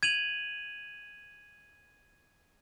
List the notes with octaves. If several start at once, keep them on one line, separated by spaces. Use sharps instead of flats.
G#6 D#7 F7 F#7